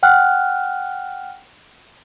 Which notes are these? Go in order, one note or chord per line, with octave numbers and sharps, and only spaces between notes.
F#5 G5 F6 F#6